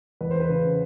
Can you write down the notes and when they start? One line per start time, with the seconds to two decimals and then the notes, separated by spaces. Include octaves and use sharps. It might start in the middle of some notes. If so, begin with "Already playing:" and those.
0.21 E2 B4
0.31 C5
0.40 B4
0.49 C#3